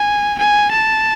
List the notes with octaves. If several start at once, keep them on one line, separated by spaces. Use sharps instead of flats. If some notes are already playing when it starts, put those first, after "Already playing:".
Already playing: G#5
G#5
A5